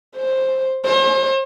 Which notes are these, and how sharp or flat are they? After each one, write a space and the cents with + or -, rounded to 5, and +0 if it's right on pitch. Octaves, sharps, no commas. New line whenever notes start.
C5 +10
C5 +40